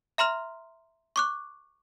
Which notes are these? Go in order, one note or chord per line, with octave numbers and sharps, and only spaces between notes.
E5 A#5 C6 F6 F7
C#6 D6 F#6